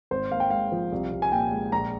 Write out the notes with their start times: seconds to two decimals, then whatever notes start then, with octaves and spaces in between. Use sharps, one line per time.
0.11 G#1 C5
0.32 A#3 F5
0.40 G5
0.50 G#2 F5
0.72 F3
0.92 C2
1.12 C2
1.22 G#5
1.32 A#2 G5
1.52 G#3
1.72 A#1 A#5